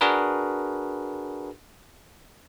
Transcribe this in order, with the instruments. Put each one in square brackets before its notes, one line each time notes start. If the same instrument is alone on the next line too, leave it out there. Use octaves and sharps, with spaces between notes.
[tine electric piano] D4 F#4 G#4 A#4 B4